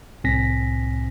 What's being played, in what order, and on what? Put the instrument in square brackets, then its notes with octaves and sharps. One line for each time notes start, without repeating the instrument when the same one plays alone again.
[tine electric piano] C2 A2 C4 G#5 A#6 B6